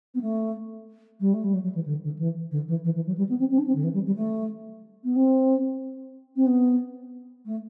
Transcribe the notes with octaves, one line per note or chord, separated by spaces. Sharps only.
B3
A3
G3
A3
G3
F#3
F#3
E3
D3
D3
E3
D3
E3
E3
E3
F#3
G3
B3
C4
C4
D4
C4
D3
E3
G3
G3
A3
B3
C4
C4
B3
A3